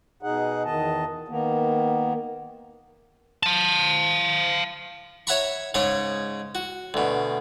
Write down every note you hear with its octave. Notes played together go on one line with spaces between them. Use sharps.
B2 D#4 G#4 F#5
E2 D#3 D#5 A5
D#3 A#3 B3
F5 A5
C#5 E5 F#5 A#5 B5 C#6
G#2 C#3 C#5 D#5
F#4
D2 B2